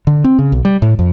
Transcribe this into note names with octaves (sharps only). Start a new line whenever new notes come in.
D3
C4
C#3
B1
G3
A2
F2